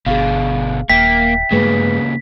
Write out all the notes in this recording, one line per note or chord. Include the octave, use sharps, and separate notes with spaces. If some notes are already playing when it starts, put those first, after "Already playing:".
G1 B2 D3 G#4 F5
D#1 A#3 E5 G5 B6
G2 A#2 C#3 G#3 A3 G#4 B4